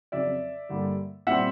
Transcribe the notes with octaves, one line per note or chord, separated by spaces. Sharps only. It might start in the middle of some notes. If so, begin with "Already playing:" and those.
F2 C#3 F#3 D5 E5
G2 D3 G3 A#3
A#2 G3 C4 E5 F#5